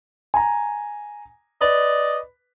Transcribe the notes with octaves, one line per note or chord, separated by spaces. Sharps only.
G#5 A#5
B4 D5 D#5